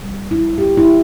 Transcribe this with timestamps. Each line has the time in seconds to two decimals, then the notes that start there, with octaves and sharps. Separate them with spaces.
0.04 G3
0.31 E4
0.58 G4
0.77 E4